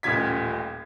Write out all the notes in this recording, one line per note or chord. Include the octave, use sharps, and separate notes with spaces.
D#1 A1 F4 G#6 B6